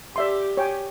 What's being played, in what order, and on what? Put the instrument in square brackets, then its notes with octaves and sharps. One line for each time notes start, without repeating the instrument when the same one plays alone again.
[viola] G4 [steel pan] D5 E5 C6
[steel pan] C#5 G5 G#5